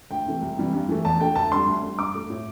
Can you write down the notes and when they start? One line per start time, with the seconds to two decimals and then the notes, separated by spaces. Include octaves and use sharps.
0.11 D2 G5
0.26 C3 E3 A3
0.42 C2
0.58 C3 E3 G3
0.73 G2
0.89 E3 A3
1.05 E2 A5
1.20 D3 A3 G5
1.36 D2 A5
1.52 D3 G3 C6
1.67 D2
1.82 D3 G3
1.99 G2 D6
2.14 D3 A3
2.30 A2